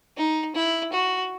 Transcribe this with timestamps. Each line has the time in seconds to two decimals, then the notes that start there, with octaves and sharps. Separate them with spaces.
0.17 D#4
0.55 E4
0.93 F#4